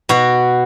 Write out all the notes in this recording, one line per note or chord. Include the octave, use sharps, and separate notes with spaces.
B2 F#4